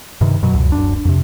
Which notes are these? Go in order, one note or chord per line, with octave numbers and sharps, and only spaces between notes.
G2 C3 D#3
F#2 B2 F#3
C#2 F#2
D1 G1 F#2 D4
F2 C3